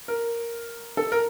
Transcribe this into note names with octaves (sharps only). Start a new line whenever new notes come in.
A#4
A4
A#4